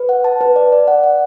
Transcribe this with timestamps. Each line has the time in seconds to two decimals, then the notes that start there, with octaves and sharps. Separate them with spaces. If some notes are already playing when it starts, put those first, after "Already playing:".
Already playing: B4
0.09 F#5
0.24 A5
0.41 B4
0.56 D5
0.72 D5
0.88 F#5
1.04 F#5